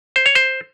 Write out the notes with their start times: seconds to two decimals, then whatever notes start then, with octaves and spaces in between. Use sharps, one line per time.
0.16 C5
0.26 C#5
0.35 C5